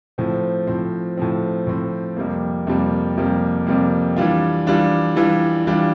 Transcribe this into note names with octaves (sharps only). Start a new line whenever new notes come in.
A2 F3 C4
A2 F3 C4
A2 F3 C4
A2 F3 C4
F2 C3 G3 A#3
F2 C3 G3 A#3
F2 C3 G3 A#3
F2 C3 G3 A#3
E3 G3 D4 F4
E3 G3 D4 F4
E3 G3 D4 F4
E3 G3 D4 F4